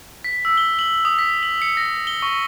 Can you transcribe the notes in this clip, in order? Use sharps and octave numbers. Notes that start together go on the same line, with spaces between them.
B6
E6
G7
F#7
D#6
B6
F#7
C#7
A#6
G7
C#6